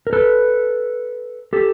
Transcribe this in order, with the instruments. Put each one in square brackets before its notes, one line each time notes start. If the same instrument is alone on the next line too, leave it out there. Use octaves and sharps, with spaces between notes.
[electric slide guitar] A#4
A4 B4
G4 A4